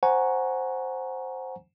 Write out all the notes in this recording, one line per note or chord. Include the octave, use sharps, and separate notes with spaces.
C5 F#5 G#5 A#5 C#6